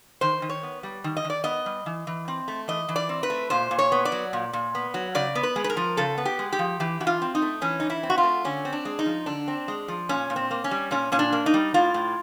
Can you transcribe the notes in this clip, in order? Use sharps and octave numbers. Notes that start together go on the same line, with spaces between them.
D#3 C5
D#3
C#5
B3
G3
D#3
D#5
D#3
D5
B3 D#5
G3
E3
E3
C4
A3
E3 D#5
E3
D5
C4
B4
A3
A#2 C5
A#2
C#5
B3
D5
F#3
A#2
A#2
B3
F#3
C#3 D5
B3
B4
G#3
B4
A#4
F3
C#3 A4
B3
G4
G#3
G4
F3
E3 G4
E3 F#4
F4
C4
D#4
A3
E3 C#4
E3 D#4
E4
C4
F#4
F4
A3
D3 C#4
C4
D4
G#3
D#4
F3
D3 D4
C4
G#3
F3
A#2 C#4
A#2
C4
A#3
C#4
G3
A#2 C#4
A#2 C#4
D4
A#3
D#4
G3
A2 F4
A2